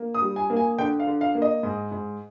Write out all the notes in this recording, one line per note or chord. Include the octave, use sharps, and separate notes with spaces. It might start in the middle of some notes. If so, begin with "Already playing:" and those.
Already playing: A#3
D#6
G3
G#5
A#3
G#5
D3 G5
F5
D3
F5
A#3
D#5
G#2
G#2